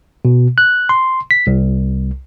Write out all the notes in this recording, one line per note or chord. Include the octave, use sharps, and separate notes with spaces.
B2
F#6
C6
B6
C2